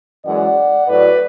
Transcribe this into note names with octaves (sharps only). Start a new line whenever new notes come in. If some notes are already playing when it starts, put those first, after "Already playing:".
F#2 E3 G#3 D5 F#5
A2 F#3 B4 D5